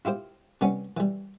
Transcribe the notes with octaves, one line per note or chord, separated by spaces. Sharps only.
E4 F4 G4 C5
C3 G3 B3 C#4
E3 G3